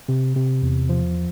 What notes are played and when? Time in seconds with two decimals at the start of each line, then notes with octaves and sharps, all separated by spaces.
0.09 C3
0.36 C3
0.62 E2
0.89 F3